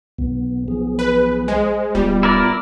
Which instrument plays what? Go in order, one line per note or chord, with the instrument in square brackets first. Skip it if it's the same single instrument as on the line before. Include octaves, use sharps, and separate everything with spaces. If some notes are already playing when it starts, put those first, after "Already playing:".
[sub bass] B1 [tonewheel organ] B2 B3
[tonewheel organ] F3 B3 G#4
[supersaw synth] B4
[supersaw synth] G#3 [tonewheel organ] C5
[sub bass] D1 [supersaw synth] G3 [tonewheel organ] B3 F4
[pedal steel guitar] E4 A#4 D5